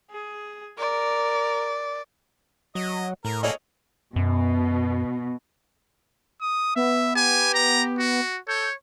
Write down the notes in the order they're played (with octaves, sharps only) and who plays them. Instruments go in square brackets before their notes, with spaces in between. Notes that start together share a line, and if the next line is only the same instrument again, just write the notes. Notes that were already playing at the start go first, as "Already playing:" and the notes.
[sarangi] G#4
[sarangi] A#4 [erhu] D5
[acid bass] F#3 [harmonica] D#5
[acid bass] A2 [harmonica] A#4
[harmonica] A#3 G#4 A4 [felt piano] C#5 D#5
[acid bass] F#2 [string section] B2
[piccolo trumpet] D#6
[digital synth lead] B3 [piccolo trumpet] E5
[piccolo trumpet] G4 [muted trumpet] G#5
[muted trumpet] A#5
F#4
[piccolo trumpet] A4 [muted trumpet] C#5 [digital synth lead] G6